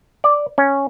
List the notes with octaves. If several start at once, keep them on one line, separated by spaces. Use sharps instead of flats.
D5
C#4